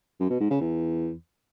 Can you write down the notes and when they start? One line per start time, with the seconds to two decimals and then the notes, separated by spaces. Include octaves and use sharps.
0.20 F#2
0.30 B2
0.40 G#2
0.50 C#3
0.61 E2